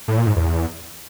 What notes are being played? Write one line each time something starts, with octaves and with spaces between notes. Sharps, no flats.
A2
A#2
G#2
E2